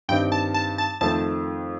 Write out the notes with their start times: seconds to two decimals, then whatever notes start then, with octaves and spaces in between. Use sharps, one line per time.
0.09 G2 D#3 G3 C4 D#4 G5
0.32 A5
0.54 A5
0.78 A5
1.01 F2 D#3 A3 C4 A5